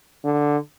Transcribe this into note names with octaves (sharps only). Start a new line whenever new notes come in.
D3